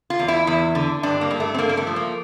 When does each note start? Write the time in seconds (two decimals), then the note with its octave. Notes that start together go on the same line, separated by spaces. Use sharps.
0.10 F4
0.19 E2
0.28 E4
0.47 E2
0.75 D3
1.03 G2 D4
1.21 A#3
1.31 G2
1.40 A3
1.54 C4
1.58 G2 A#3
1.69 A#3
1.77 A3
1.87 F3
1.96 A#3